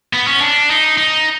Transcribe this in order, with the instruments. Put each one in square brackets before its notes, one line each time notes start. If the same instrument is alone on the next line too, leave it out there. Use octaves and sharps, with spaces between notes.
[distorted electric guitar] B3
C#4
D4
D#4
D#4